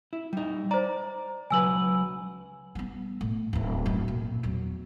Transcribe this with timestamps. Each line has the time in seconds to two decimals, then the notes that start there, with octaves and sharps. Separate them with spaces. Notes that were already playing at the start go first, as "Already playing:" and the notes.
0.13 E4
0.33 G3 D#4
0.71 C5 D5 A#5
1.50 C#2 F#3 B4 G#5 E6 F#7
2.75 G3 B3
3.21 A2
3.53 D1 E3
3.86 F#2 A2
4.08 A#2
4.43 E2 F#3